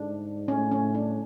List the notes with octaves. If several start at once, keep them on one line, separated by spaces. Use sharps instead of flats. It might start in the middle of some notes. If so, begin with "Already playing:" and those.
Already playing: G#2 D4
A2 C#4
C#4
D4